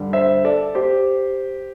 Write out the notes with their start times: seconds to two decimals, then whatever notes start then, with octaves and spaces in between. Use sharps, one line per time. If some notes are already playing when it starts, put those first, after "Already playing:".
Already playing: G2 D3 G3
0.13 C5 E5
0.45 A4 D5
0.75 G4 C5